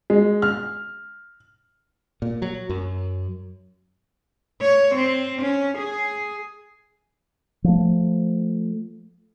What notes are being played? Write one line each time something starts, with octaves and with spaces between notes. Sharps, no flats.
G#3
F6
A#2
F#3
F#2
C#5
C4
C#4
G#4
F3 A3